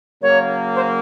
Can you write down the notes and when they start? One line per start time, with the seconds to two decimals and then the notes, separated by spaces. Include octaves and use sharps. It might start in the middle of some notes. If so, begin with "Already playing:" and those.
0.21 C#3 F#3 A#3 C#5
0.75 C5